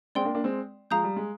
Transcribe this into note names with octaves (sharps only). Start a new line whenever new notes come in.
G#3 C4 D5 G5 C6
A#3 D4
A#3 D4
G#3 C4
F3 G#3 F5 A#5 D#6 G6
G3
G#3